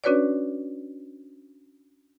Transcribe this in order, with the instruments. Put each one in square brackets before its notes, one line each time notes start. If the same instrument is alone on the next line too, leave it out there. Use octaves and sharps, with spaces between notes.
[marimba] C#4 D4 F#4 B4 C#5 D5